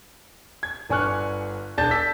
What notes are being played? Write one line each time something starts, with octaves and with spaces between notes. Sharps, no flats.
G#6
G1 D4 G#5 C#6 F6 F#6
E1 D4 G#4 A5 G6 A6
E6 B6